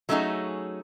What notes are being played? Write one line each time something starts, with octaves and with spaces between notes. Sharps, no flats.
F#3 A3 C#4 D#4 F#4 G#4